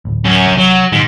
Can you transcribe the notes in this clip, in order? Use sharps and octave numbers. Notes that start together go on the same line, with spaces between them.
D1 A1
F#2 C#4
C2
F#3
G#2 B2 D#3 G3